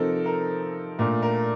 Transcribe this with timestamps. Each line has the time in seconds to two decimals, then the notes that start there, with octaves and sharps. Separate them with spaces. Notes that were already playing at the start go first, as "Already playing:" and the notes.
Already playing: C3 F3 C4 D#4 A4 A#4
0.26 A#4
0.99 A#2 A3 D4 A#4
1.22 A#4